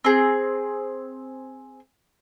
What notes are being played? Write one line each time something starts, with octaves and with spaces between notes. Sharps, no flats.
C4 G#4